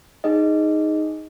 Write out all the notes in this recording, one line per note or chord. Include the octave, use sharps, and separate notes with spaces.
D#4 G#4 D#5